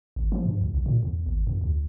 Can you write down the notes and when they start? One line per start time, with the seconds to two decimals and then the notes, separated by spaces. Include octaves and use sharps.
0.16 G#1
0.32 F3
0.45 G2
0.61 C#2
0.74 B1
0.86 A#2
1.03 E2
1.26 G#1
1.47 F2
1.61 D2